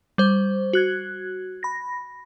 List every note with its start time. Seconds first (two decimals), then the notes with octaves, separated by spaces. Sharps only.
0.18 G3 C5
0.73 F#4 F#6 G#6
1.63 B5 A#6